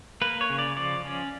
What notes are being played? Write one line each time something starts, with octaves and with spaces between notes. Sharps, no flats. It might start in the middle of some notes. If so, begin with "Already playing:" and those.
A#3 B4
C#5
C#3
D5
F3 D5
C#4